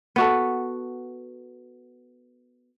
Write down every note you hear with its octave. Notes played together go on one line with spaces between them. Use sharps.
B3 F#4 A4